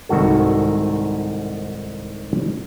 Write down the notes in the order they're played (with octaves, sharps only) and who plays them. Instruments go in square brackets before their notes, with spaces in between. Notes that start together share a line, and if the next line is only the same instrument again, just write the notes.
[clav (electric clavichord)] C2 G#2 D#3 F#4 A4